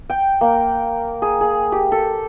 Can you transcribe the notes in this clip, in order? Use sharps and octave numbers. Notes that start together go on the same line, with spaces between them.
G5
A#3
G#4
G#4
G4
A4